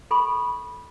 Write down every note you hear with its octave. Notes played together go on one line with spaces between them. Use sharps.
A4 B5 C#6